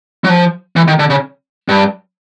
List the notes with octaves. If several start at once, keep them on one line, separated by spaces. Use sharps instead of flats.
F#3
F3
E3
D#3
D3
C#3
G2